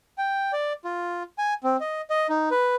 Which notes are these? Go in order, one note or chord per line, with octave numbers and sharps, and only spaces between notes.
G5
D5
F4
G#5
C4
D#5
D#5
D#4
B4